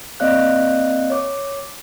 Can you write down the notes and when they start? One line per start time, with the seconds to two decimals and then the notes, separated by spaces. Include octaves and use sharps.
0.20 A#3 C4 D5 D#5 F5 F#6
1.10 C#5 D6